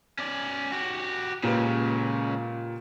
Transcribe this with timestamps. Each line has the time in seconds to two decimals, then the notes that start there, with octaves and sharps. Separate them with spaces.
0.19 C#4 D5
0.72 F#4 G4
1.43 C#2 A#2 C#3 G4 B4